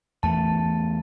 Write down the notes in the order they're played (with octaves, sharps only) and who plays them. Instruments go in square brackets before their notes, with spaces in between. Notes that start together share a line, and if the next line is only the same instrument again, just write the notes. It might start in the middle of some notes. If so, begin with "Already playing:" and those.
[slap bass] E2 A3 [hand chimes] A5